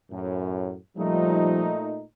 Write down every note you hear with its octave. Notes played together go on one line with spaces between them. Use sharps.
F#2 A2
A#2 F3 G3 A3 D#4